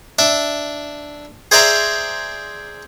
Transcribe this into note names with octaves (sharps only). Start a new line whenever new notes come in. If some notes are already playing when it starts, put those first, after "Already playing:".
D4 E5
G#4 C5 D5 E5 A#5